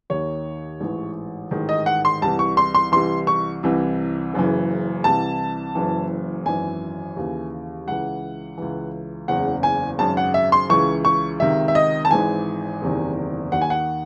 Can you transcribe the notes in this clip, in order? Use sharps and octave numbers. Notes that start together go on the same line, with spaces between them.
D#2 D#3 C#5
A1 G#2 E3
A1 G#2 D#3
D#5
F#5
C6
C2 C3 E3 A5
C#6
C6
C6
C2 C3 E3 C6
C#6
C2 C3 E3
F#1 F#2 C#3 E3
C2 C3 E3 A5
F#1 F#2 E3
G#1 F#2 E3 G#5
D#2 C#3 E3
C#2 C#3 E3 F#5
C#2 C#3 E3
F#1 E2 C#3 F#5
G#5
G#1 F#2 C#3 A5
F#5
E5
C6
C#2 C#3 E3 C#6
C#6
C#2 C3 D#3 E5
E5
D#5
A5
G#1 G#2 E3 G#5
F#1 E2 C3 D#3
D#2 D#3 F#5
G#5
F#5